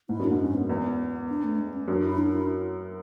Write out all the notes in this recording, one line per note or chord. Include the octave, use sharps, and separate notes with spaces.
G#2 E4
F#2 D4
G#2
C#4
B3
E2 B3
D4
A3
G#3
C#4
F#2 D4
E4
D4
E4